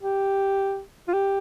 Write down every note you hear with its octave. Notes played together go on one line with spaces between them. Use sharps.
G4
F4
G4